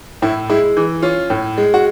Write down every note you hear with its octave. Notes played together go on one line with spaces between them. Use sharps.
A2 E4
G#3 E4
E3
C#4 F4
A2
G#3
F#4